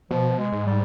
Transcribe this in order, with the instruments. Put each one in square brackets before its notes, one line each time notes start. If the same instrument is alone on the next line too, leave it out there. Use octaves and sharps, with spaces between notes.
[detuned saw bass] B2 [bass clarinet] F3
[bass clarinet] G#3
[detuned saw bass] G#2
[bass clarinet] G3